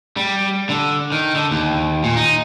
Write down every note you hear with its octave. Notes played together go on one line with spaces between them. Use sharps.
G3
D3
D#3
D3
D#2
A#2
D#4